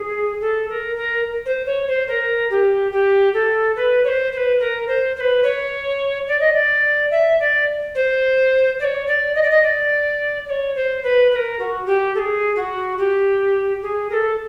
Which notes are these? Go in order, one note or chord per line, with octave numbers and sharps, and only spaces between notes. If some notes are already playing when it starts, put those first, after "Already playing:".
Already playing: G#4
A4
A#4
A#4
C5
C#5
C5
A#4
G4
G4
A4
B4
C#5
C5
C5
B4
A#4
C5
C5
B4
C#5
D5
D#5
D5
E5
D5
C5
D5
C#5
D5
D#5
D5
D#5
D5
D5
C#5
C5
B4
B4
A#4
F#4
G4
A4
G#4
F#4
G4
G#4
A#4
A4